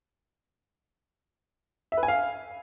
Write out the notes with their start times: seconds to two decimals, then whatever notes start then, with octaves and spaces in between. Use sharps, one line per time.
1.92 E5
1.97 B4
2.03 G#5
2.08 F5